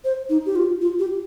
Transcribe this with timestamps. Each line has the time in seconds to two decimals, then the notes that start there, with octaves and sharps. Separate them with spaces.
0.04 C5
0.30 D#4
0.46 G4
0.56 F4
0.81 F4
0.99 G4